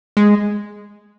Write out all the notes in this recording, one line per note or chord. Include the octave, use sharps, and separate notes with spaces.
G#3